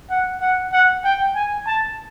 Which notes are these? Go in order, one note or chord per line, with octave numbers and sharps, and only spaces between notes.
F#5
F#5
F#5
G5
G#5
A5